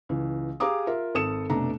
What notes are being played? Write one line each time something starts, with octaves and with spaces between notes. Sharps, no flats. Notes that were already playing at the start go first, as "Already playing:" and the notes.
C#2 E3
G4 G#4 F5 A#5 D6 D#6
F4 A#4 E5
G#1 A4 D#6 C#7 E7
F1 B2 A3 D4 A#5